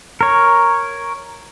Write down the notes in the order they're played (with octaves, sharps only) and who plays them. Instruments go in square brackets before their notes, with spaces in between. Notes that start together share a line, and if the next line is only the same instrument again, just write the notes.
[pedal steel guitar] A#4 C#5